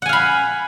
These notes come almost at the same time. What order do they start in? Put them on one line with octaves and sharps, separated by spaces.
F#5 G#5 F5 B5